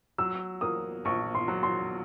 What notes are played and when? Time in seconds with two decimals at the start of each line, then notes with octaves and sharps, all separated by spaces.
0.18 F#3 E6
0.61 A#3 D#6
1.05 A#1 C#6
1.35 C6
1.48 F#3
1.63 C6